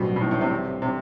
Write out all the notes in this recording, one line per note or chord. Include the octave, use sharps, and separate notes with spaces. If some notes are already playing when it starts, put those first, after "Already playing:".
Already playing: A1 G2 B2 F#3 C4 F#4
B2
A2
A2
C3
C3